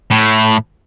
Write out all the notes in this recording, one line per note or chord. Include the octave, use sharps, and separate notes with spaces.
A2